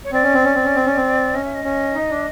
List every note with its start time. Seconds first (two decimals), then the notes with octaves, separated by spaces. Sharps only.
0.04 C#5
0.12 C4 D5
0.23 C#4
0.34 C4
0.44 C#4
0.55 C4
0.65 C#4
0.76 C4
0.86 C#4
0.97 C4
1.34 C#4 D#5
1.44 E5
1.54 D#5
1.64 C#4
1.94 D#4
2.10 D4